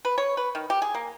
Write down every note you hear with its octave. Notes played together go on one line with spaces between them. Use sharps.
B4
C#5
B4
D#3
G4
G#4
A#3